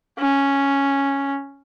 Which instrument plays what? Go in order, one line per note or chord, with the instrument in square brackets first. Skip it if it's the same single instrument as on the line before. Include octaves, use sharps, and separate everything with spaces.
[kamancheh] C#4